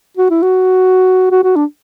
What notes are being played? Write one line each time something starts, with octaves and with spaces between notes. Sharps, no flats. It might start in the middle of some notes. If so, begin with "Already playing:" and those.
F#4
E4
F#4
F#4
F#4
D4